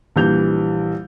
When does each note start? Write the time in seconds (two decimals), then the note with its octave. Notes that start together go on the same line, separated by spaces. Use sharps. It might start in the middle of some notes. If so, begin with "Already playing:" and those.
0.16 A#1 E3 G3 G6 F7